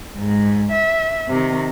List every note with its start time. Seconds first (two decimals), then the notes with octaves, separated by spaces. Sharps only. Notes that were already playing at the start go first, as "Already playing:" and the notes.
0.16 G#2
0.71 E5
1.28 C3 D#3